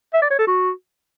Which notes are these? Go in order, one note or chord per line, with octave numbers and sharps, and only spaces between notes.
E5
D5
C#5
A4
F#4